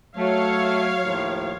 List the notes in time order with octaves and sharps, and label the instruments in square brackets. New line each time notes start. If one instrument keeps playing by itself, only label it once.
[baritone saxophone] F#3 [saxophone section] A3 [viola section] C#5 F5
[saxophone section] D#2 A2 F3